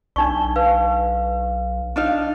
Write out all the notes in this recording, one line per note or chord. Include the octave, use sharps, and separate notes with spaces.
B1 D4 D#4 C#6
B4 F5
D4 D#4 F5